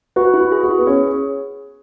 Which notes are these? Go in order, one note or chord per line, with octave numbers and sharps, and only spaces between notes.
F#4 B4
E4
F#4
G#4
F#4
E4
B3
C#4 G#4